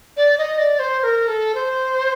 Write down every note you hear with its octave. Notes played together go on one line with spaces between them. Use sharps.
D5
D#5
D5
C5
C5
A#4
A4
C5